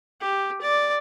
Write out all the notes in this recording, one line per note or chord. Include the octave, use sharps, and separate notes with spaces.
G4
D5